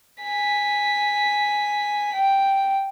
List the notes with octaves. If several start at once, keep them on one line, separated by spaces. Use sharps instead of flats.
G#5 B6
G5